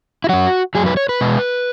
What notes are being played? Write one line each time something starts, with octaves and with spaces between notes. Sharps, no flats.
E4
F#2 F#3 F#4
F#2 F#3 G#4
B4
C#5
B4
B2 G#3